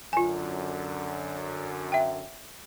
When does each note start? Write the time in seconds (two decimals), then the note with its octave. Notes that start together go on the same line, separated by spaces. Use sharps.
0.13 F#2 D3 F4 G#5
1.92 E5 G5